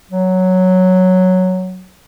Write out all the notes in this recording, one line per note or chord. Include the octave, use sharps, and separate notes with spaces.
F#3